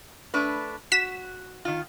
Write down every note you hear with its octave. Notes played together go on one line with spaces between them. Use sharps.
A3 D4 B4
F#4 B6 E7
D#3 F4